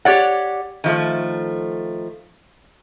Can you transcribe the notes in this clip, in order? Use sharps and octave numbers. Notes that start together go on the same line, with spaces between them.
G4 C#5 D5 F#5
D#3 F3 A3